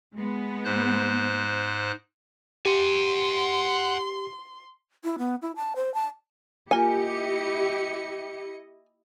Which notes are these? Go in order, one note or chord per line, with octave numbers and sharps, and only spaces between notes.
G#3 B3
G#2 C5 F#6
G4 F#5 G#5 C6
E4
B3
E4
A5
C5
A5
A#3 E4 F4 G4 A#4 D#5 G#5 C#7